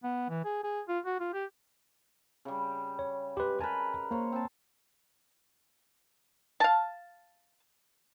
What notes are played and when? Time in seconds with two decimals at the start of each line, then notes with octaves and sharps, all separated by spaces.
0.04 B3
0.29 E3
0.45 G#4
0.64 G#4
0.88 F4
1.05 F#4
1.20 F4
1.33 G4
2.45 C#3 G3
2.99 C#5
3.37 G#3 G4 B4
3.60 A#4 B4 G#5 A5
4.11 A#3 C5 C#5 A#5
4.32 C4 A5
6.60 F5 A5